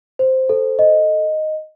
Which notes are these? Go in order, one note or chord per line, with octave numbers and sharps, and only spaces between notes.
C5
A4
D#5